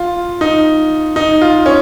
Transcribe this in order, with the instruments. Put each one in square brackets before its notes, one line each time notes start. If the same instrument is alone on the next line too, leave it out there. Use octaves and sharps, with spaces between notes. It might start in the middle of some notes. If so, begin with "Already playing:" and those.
Already playing: [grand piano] F4
D#4
D#4
F4
C#4